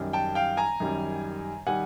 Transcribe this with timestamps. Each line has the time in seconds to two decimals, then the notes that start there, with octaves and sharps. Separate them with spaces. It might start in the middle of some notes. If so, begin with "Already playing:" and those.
Already playing: F#2 D#3 G3
0.13 G5 A5
0.35 F5 G5
0.57 G#5 A#5
0.80 F#2 D#3 G3
1.67 D#3 G3 F#5 G#5